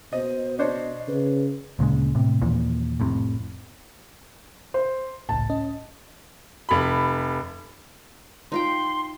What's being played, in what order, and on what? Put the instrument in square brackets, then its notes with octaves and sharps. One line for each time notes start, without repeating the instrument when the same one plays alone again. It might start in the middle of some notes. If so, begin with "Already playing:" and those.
[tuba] B2 [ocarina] C5 [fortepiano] D#5
[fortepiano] D4 C5 C#5 [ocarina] D#5
[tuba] C#3 [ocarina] B4
[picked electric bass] D2 A#2 C#3 G#3
A2 C3
D#2 A#2 E3 F3
F1 A2 C3
[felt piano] C5
[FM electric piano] G#1 C#2 A2 [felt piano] A5
[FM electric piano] C#4 D#5
[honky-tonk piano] F1 B5
[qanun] D#4 F4 G5 [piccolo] C6